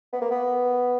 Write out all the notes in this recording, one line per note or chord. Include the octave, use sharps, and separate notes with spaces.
B3
A#3
B3